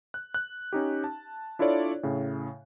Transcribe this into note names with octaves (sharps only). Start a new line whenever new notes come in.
F#6
F#6
C#4 D#4 G4
A5
D4 E4 F4 A4 C#5 D5
A2 C#3